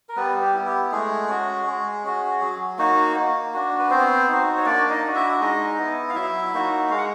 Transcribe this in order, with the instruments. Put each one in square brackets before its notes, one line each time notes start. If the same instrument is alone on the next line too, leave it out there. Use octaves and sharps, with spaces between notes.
[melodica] A#4
G3 B3 B4
G4
B3 E4
G4
G#3 A3 G#4
C#4 F#4
G#3
C#4 F#4
F#3
A#3 D#4 F#4
A#3
D4 F#4
B4
B3 C4 C5
D#4 F#4
C#5
A#3 D4 D5
D#4 D#5
D4 F#4
E4 E5
G#3 D#4 D#5
B3 E4
F5
F#3 E4 E5
A#3 D#4 F#4
G#3 F5
F#5